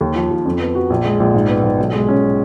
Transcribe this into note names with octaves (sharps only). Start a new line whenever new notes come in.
D#2
F3
D#2
F2
B3
F#4
A#1
G#3
A#1
G#2
B3
G#2
B1
G#3
C#4